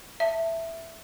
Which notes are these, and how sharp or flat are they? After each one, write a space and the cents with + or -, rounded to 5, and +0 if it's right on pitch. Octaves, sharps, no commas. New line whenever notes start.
E5 +0 A5 +25